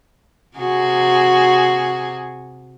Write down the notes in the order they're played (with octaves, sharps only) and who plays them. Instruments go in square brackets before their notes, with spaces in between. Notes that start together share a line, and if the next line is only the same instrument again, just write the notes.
[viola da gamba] C3 F#4 G#4